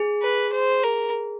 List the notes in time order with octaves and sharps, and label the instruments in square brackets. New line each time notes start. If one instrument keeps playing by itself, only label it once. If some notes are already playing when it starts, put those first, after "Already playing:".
Already playing: [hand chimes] G#4
[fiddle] B4
C5
A#4